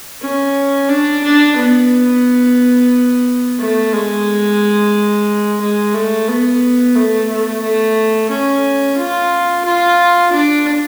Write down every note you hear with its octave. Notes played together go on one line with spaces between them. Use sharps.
C#4
D4
D4
B3
A3
G#3
G#3
A3
B3
A3
A3
A3
C#4
F4
F4
D4